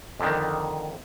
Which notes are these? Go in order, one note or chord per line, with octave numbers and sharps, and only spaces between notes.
F2 D3 D#3